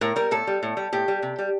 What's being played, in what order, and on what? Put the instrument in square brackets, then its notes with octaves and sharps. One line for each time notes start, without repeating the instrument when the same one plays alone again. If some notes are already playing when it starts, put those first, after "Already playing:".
[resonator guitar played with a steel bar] A2 A#4
G3 A#4
A2 A4
G3
A2
G3
A2 G4
G3
C3
G3